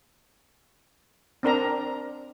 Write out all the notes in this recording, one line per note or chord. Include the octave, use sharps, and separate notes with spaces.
C4 D4 A#4 A#5